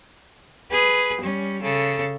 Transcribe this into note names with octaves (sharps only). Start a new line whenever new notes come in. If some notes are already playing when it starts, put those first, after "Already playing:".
G#4 B4
G3 C#4
C#3 A4